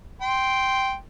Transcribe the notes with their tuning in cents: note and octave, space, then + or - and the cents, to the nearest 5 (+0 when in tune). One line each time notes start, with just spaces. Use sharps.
G5 -5 C6 +0